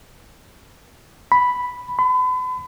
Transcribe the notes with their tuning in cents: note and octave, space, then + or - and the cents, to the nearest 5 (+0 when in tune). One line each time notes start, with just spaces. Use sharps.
B5 +0
B5 +40